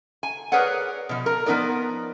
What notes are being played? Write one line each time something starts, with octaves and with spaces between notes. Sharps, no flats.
G#5
G#4 A#4 B4 C#5 D5 F#5
B2 F3
A#4
F3 B3 D#4 A#4 D5